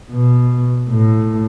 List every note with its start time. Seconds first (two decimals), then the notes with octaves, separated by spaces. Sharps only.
0.10 B2
0.89 A2